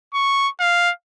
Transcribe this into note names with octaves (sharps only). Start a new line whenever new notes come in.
C#6
F5